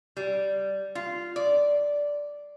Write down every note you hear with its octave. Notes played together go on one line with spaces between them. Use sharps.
G3
F4
D5